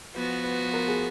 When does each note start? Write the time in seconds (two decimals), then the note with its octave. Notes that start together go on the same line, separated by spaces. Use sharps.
0.14 F3 B3 F#4 B4
0.44 B4
0.74 A#4
0.88 G#4